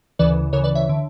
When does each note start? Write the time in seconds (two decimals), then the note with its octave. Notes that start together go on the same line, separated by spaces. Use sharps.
0.19 D2 C#3 E3 B4 D5
0.53 D2 C#3 E3 A#4 C#5
0.64 B4 D5
0.75 C#5 E5
0.89 D3